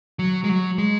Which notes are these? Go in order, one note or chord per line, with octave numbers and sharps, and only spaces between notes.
F#3
G#3
F#3
G#3